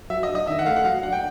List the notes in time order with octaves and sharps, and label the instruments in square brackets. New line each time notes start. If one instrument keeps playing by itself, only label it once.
[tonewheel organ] F#3 [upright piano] E5
[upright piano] D#5
[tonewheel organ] D4
[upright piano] D#5
[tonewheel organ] D#3 [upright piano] E5
[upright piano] F#5
[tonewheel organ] A3 [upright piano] F5
[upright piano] F#5
[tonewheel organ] F#3 [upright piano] F5
[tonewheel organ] D4 [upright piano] F#5
[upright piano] G5